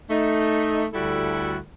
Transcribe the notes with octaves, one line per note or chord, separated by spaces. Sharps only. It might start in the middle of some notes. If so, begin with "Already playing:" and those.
A3 D#4
D2 G3 E4 F#4 A4